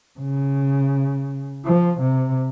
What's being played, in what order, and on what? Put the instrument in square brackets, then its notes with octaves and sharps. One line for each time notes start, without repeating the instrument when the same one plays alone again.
[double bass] C#3
F3
C3